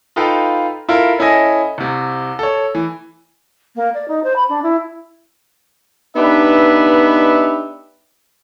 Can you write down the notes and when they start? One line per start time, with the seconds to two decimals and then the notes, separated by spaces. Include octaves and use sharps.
0.16 D#4 F4 A4 B4 F5 G5
0.89 E4 F4 A4 A#4
1.19 C#4 E4 A4 D#5 G#5 A#6
1.78 C2 C3
2.39 A4 C#5
2.75 E3
3.75 A#3
3.94 D5
4.07 D#4
4.23 C5
4.35 B5
4.49 D4
4.62 E4
6.16 B3 D4 D#4 G4 B4 E5